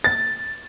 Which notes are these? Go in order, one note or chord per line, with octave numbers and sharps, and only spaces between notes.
A6